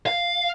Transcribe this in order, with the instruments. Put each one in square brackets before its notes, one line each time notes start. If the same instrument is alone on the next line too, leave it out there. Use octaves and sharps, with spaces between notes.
[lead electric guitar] F5